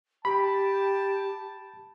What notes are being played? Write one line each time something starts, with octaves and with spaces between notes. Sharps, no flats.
G4 A5 B5